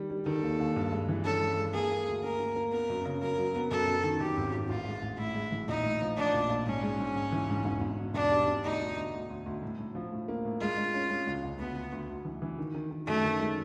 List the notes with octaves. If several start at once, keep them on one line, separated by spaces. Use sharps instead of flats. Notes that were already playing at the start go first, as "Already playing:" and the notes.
Already playing: D#3 G3
G3
D#3 A4
D#2
D#2
G2
G#3
E3
C#4 A4
G#3
G#3
A#3 G#4
A#3
D2
A#3 A#4
A#3
A#3
B3 A#4
F#2
C#3
F#3 A#4
F#3
B3
F#2 A4
F#2
D#3
F#2 G4
G#1
G#1
A1 F4
G#3
A1
A2 E4
G#3
E3
A#1 D#4
A2
F3
F3 D4
A#1
A#1
G#2 C#4
G#3
G#2
G#2
E3
G#2
E1
E1
B2
E1 D4
G3
E1
D2 D#4
D2
D2
D2
D2
D2
A2
A2
F3
A2
A#3
A2
G#3 F4
G#3
C#4
G#3
C#2
C#2
D2 B3
D2
D2
D2
E3
E3
D#3
D#3
D#3
F#2 A3
D#3
G#3